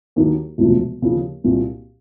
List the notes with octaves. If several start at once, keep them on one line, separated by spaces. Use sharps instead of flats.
D#2 D#3 F#3 A#3
E1 D2 C3 F3
D#2 C#3 F3
C2 A#2 F#3